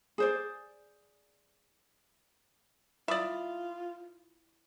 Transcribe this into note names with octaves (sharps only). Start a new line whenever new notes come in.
G#4 C5 D5
E4 F4 D5 E5 B5 D#6